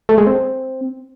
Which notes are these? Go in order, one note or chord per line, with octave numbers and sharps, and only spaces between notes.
A3
G#3
C4